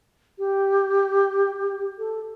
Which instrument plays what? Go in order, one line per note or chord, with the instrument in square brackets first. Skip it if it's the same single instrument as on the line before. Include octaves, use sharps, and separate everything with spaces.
[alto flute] G4
A4